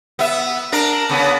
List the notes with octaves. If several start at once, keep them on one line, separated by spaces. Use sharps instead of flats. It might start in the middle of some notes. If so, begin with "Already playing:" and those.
B3 E5
D4 A#4
C#3 B3